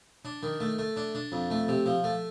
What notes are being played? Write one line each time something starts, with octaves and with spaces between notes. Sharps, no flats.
D4
D#3
A3
A3
D4
D4
F2
A3
C3
F3
A3